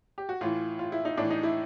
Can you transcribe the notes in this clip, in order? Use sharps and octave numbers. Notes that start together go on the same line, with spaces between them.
G4
F#4
A2 E3 F4
F4
E4
D#4
A2 E3 D4
D#4
E4